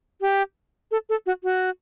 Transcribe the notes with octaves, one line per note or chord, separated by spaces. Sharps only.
G4
A4
A4
F#4
F#4